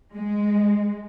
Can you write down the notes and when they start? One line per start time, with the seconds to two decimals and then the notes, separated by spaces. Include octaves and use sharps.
0.13 G#3